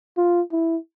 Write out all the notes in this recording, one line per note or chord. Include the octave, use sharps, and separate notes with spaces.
F4
E4